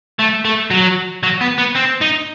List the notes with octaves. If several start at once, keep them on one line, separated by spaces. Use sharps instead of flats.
A3
A3
F#3
F#3
B3
B3
C4
D#4